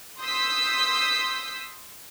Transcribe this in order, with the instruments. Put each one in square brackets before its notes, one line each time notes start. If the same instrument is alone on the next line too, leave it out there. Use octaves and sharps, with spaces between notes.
[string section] C6 D#6 E6 G6 B6